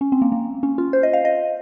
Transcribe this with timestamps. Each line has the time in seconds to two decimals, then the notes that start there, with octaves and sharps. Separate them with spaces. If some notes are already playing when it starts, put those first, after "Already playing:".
0.01 C#4
0.12 C4
0.22 A#3
0.32 A#3
0.63 C#4
0.78 F4
0.93 C5
1.03 D#5
1.13 F5
1.25 D#5